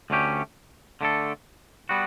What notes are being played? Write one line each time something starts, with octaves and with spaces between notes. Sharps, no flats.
D2 D3 A3 C#4 G4
D3 A3 D4 A4
G3 B3 F#4